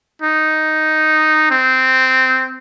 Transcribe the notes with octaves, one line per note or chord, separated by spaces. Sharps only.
D#4
C4